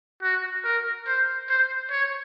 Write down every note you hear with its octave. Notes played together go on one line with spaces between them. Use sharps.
F#4
A#4
C5
C5
C#5